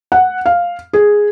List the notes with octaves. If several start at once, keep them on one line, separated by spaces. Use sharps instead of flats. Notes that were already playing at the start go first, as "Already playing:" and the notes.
F#5
F5
G#4